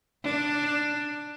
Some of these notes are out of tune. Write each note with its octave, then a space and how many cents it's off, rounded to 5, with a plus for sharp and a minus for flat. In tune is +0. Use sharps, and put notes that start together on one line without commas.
D4 +5